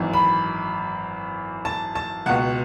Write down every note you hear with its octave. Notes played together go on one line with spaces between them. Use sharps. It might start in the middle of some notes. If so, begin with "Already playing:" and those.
Already playing: G#1 F#2 E3
B5
A5
A5
C#2 B2 F#5